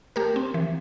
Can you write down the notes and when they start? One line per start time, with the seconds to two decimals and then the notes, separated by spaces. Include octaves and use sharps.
0.16 A3 G4 A#4
0.36 C4
0.54 E3